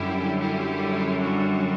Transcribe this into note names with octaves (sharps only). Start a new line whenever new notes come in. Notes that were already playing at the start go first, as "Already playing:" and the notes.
Already playing: F#2 D3 G3 E4 G4
E4 G4
D4 F#4